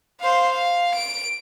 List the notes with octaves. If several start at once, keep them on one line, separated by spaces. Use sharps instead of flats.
C5 F5
F5
D7